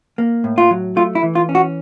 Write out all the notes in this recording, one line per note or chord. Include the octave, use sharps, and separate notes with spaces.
A#3
A2
F4
F#3
A3 F4
E4
E3
F4
C#4
F#4